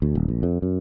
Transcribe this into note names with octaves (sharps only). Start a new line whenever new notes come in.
D2
D#1
A#1
F2
F#2